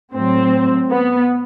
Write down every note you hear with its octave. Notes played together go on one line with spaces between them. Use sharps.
A2 F#3 C4
B3